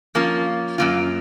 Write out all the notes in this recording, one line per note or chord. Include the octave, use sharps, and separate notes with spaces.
F3 A#3 C#4 F4
F#2 D#3 A#3 F4